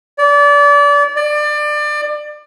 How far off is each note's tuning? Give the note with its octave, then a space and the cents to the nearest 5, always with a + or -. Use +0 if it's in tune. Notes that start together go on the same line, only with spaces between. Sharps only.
D5 -30
D5 +25